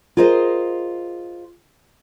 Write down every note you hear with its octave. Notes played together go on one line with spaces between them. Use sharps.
F4 G#4 A#4 C5 D#5